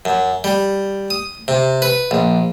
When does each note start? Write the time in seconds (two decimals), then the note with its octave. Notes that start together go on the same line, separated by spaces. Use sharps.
0.05 F#2
0.44 G3
1.10 D#6
1.48 C3
1.82 B4
2.11 A#1